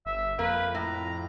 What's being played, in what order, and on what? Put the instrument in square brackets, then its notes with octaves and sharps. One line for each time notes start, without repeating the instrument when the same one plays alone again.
[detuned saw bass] G1 [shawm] E5
[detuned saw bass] F2 [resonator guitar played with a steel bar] A#3 [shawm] B4
[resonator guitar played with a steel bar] A2 [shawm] A#5